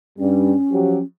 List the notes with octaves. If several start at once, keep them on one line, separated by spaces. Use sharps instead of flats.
G2 G3 C#4
F3 F#3 G4